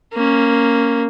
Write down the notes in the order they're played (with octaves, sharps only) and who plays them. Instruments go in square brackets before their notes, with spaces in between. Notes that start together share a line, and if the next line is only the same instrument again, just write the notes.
[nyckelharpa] A#3 C#4